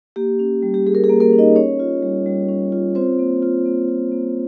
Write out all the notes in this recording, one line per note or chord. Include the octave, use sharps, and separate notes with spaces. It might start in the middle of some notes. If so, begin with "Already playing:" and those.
A#3 G4
C#4
G3
G4
G3 G#4
A#4
G#4
A#3
A#3 A#4
C#4
D#4 D#5
C#4 C#5
F4
G3
G3
C#4
F4
C4 F4 C5
A#3
F4
A#3
F4
A#3